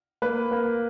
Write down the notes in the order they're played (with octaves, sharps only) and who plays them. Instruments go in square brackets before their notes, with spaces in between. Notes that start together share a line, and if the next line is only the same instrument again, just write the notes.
[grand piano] A#3 B4
A#3